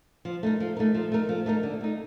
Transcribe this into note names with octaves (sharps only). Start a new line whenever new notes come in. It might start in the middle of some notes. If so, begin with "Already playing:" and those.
F3
A3 D#4 A#4
F3
A3 D#4 A#4
F3
A3 D#4 A#4
F3
A3 D#4 A#4
D3
A3 D#4